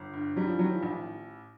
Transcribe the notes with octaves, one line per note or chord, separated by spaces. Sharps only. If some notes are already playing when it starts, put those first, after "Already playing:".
Already playing: G1
G2
F#3 G3
F3
D#3 F#3
F3
A1